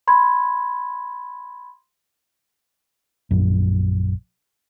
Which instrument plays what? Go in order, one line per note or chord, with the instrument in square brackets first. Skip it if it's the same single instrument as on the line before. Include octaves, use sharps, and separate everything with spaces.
[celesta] B5 C6 G#6
[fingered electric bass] A#1 F#2